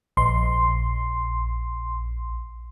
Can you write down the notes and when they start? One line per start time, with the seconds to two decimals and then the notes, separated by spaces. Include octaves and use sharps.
0.17 A#1 C6